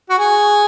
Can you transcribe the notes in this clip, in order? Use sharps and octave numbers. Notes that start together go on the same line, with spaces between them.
F#4
G#4